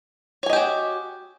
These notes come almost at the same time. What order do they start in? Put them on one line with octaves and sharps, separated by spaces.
C#5 G#5 D#5 G4 F#4